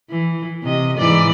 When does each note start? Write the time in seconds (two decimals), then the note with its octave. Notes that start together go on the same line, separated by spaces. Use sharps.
0.10 E3
0.63 C3 D#5
0.98 G#2 E3 D5